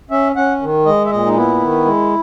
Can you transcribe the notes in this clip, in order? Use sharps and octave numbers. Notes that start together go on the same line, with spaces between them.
C#4 E5
C#4 F#5
D#3
G#3 D#5
E5
A#2 D#5
D#4
B3 E4
D#3
G#3